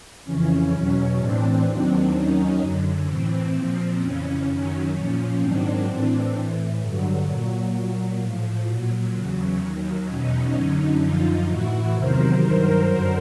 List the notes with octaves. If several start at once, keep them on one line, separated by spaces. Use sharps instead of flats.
F2 C#3 E3 C#4
E2 B2 F#3
A2 E3 C4 D4
D#2 D#3 F#3 C4 D4
D#2 D#3 F#3 C#4 D#4
F#2 D3 F#3
A2 E3 C4
A#2 F3
F2 C#3 E3 C#4
F#2 D#3 F#3 C#4
A#2 F3
G#2 D#3 F#3 C4 D4
A2 E3
A2 E3
G2 D3 F#3
A#2 F#3
A#2 F#3
A2 F3
A#2 F#3
E2 C#3 F#3
D#2 D#3 F#3
E2 B2 F#3 C#4 D#4
F#2 D3 F#3
F#2 D3 F3 D#4 F4
A2 E3 E4 F#4
E2 C3 D#3 F#3 A#4 C5
G2 D#3 F#3
F#2 D3 F#3